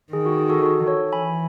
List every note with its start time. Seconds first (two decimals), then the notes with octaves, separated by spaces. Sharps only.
0.13 D#3 G#4
0.26 F#4
0.38 G#4
0.49 F#4 A4
0.62 F#4 A4
0.87 A4 C#5
1.12 E3 G#5 B5